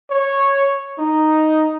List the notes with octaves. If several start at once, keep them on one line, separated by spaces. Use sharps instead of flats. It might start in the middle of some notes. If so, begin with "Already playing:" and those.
C#5
D#4